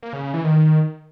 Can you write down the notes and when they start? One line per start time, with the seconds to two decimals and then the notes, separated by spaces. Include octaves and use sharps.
0.03 A#3
0.13 C#3
0.23 C#3
0.34 E3
0.44 D#3